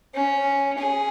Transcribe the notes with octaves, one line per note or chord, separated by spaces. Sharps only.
C#4
G#4